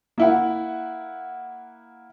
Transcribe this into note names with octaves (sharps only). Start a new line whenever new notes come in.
A#3 E4 F#5